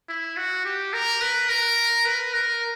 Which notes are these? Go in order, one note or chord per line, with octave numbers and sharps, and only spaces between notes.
E4
F#4
G4
A#4
B4
A#4
B4
A#4